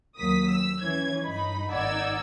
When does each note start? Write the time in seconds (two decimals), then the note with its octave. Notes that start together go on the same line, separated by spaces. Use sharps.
0.18 D#2 F#3 A#3 D#6 B6
0.49 E6
0.81 E3 C#4 G#6
1.24 G2 D#4 B5
1.70 G#1 D#4 D5 F#5 E6 G#6